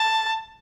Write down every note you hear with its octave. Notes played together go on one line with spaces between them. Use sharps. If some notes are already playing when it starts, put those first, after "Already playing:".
Already playing: A5